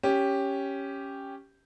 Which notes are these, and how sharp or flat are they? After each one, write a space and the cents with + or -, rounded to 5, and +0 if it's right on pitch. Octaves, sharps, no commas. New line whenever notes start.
C#4 +0 G4 +0